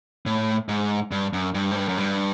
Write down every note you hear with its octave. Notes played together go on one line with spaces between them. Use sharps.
A2
G#2
G2
F#2
G2
G#2
G2
F#2
G2